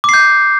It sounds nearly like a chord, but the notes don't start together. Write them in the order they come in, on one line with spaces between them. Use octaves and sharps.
D6 C7 G6